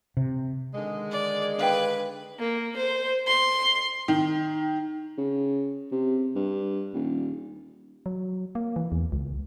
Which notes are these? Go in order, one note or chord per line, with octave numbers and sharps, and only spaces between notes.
C3
D3 D#3 G#3
D5
D4 B4 F5 G5
A#3
C5
C6
D#3
C#3
C3
G2
D#1
F#3
A#3
E3
E2
C#2